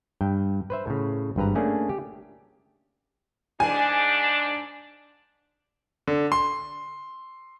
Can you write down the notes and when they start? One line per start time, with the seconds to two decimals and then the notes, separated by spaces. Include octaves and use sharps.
0.21 G2 G5
0.70 B4 C5 E5
0.87 A2 C#3
1.36 G#1 G2 B4 A#5
1.55 A3 A#3 C#4 D4 G#4
1.89 G4
3.60 G#2 D4 G#5
6.07 D3
6.32 C6